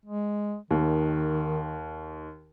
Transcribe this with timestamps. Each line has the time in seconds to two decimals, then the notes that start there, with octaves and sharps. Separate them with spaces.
0.06 G#3
0.71 D#2 D#3